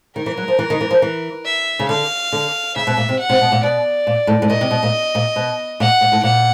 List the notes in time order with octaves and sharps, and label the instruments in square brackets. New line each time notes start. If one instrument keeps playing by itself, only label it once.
[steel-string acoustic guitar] D#3 [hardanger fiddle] A#4
[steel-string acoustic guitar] E3
F#3
F3
E3
D#3
E3
F3
E3
[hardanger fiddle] E5
[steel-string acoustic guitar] C#3
[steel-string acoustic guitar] D3 [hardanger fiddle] F5
[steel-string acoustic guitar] D3
[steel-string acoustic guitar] C#3 [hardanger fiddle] E5
[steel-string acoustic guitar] B2
A#2
C3
[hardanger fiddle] F#5
[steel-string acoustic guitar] C3
B2
A#2
[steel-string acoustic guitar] B2 [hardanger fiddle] D5
[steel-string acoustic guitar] A#2
A2
A2
[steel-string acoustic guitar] A#2 [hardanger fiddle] D#5
[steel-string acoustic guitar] C3
B2
A#2
A#2
B2
[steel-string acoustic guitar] A#2 [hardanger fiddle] F#5
[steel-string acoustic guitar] A#2
A2
[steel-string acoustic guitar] A#2 [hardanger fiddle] F#5